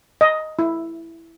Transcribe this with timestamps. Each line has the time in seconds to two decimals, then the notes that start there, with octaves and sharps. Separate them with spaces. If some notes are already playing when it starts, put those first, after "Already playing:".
0.21 D#5
0.59 E4